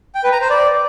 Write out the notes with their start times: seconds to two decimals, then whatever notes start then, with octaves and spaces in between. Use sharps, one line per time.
0.15 G5
0.23 B4
0.32 A#5
0.41 C5
0.50 D5